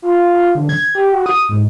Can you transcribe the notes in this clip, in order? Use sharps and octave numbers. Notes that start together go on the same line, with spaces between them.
F4
F4
D3
G#6
G4
F#4
D#6
G#2